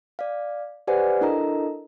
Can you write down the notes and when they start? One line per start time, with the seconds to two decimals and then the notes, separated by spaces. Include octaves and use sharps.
0.19 D5 F5
0.87 G4 B4 C5 D5 F#5 G#5
1.21 D4 E4 A4 A#4 D#5 A#5